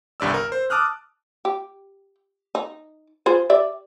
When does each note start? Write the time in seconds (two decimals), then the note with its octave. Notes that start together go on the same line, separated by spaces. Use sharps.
0.20 G1 C2 G2 D5 E6
0.34 A#4
0.52 C5
0.70 A5 D6 D#6 F6 F#6
1.45 G4
2.55 D#4
3.26 F4 G#4 C5
3.50 G4 D5 E5